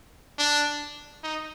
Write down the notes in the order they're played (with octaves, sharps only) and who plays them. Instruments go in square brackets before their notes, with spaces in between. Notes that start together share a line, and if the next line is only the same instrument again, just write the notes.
[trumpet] D4
D#4